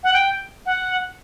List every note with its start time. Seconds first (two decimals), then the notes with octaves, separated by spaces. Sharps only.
0.04 F#5
0.13 G5
0.66 F#5